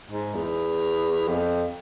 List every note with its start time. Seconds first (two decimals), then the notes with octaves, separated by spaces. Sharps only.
0.11 G#2
0.35 E2
1.28 F2